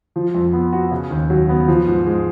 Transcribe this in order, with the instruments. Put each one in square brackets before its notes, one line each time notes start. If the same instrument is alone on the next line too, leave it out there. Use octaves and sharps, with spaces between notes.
[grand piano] F3
F2
B3
F#4
C#3
D#2
F#3
B3
F3
G#2
G#3